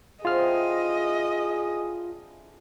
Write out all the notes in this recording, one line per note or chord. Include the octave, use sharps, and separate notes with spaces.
D3 C4 E4 F4 G#4 D#5 F6